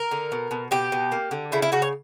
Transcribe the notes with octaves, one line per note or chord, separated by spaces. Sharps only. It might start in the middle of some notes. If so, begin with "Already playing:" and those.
Already playing: A#4
D3
B2
B2
B2 G4
B2
A#3
D3
C#3 E4
E4
C#3 F#4
C#5